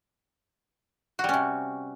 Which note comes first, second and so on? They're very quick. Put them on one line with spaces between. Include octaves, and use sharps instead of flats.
F#4 G3 C#4 C3